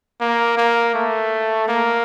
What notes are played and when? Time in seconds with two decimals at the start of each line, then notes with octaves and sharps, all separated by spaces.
0.20 A#3
0.58 A#3
0.94 A3
1.68 A#3